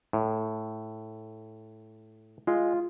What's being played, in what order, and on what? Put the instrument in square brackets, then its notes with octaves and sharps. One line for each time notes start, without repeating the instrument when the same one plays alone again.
[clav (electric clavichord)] A2
[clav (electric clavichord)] G#3 [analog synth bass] F4